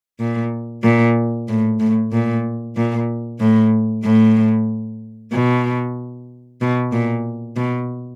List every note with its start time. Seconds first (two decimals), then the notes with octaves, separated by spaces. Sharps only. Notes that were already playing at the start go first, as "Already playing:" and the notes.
0.20 A#2
0.83 A#2
1.48 A2
1.80 A2
2.12 A#2
2.76 A#2
3.40 A2
4.04 A2
5.32 B2
6.61 B2
6.92 A#2
7.56 B2